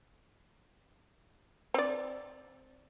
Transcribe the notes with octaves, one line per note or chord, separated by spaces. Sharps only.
C4 D5